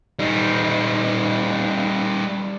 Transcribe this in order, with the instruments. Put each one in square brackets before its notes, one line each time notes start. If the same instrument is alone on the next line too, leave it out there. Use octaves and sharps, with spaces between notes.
[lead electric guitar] G3 D#4